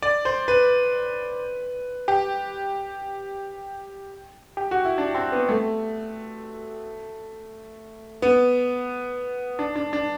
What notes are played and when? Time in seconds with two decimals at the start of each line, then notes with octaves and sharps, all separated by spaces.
0.02 D5
0.25 C5
0.48 B4
2.08 G4
4.57 G4
4.71 F#4
4.85 E4
4.98 D4
5.14 C4
5.32 B3
5.49 A3
8.22 B3
9.59 D4
9.76 D4
9.93 D4